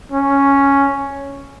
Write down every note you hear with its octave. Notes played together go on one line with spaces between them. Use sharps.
C#4